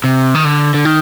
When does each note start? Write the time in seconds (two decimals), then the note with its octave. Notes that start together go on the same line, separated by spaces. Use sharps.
0.04 C3
0.35 D#3
0.45 D3
0.74 D3
0.85 D#3